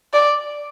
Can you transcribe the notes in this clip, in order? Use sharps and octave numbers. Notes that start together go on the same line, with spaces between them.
D5